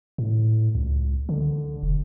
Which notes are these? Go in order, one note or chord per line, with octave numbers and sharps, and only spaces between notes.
A2
C#2
D3
E1